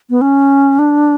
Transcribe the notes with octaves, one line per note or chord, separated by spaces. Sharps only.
B3
C#4
D4